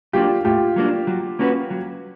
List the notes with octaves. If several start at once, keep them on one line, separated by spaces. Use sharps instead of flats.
F#3 A#3 D4 F4 G4
A2 F4 G4
F#3 A#3 D4
F#3
A#3 C#4 F#4 B4
F#3